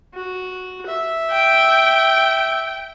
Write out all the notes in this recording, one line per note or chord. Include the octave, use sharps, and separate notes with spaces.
F#4
E5
G5